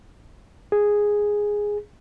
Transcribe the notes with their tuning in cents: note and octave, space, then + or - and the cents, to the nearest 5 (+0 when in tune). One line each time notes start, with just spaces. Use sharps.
G#4 -5